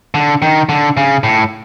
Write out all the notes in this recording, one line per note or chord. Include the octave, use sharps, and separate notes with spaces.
D3
D#3
D3
C#3
A2